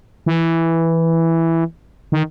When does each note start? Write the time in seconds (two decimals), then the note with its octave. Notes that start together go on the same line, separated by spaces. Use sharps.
0.26 E3
2.12 D#3